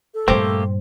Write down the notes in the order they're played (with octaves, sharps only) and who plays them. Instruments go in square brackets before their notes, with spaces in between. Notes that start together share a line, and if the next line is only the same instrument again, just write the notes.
[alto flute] A4
[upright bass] G2 A#2 [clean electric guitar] A3 A#3 G4 [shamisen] C4